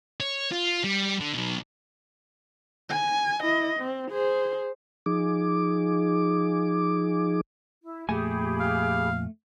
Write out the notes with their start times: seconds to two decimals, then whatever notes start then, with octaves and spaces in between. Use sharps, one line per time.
0.20 C#5
0.52 F4
0.84 G3
1.20 D3
1.34 B2 F#3
2.89 G#5
3.42 E4 D#5
3.80 C4
4.11 G#4 C5
5.06 F3 D#4 G#4 D6
7.82 E4
8.09 F2 A#2 A3 G4 G#4 G#5 B5
8.60 F5